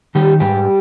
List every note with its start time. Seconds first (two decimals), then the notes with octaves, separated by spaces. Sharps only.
0.15 D#3 G3 G4
0.40 G#2 G3 G4